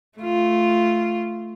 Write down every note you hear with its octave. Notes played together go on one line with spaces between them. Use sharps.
A3 F4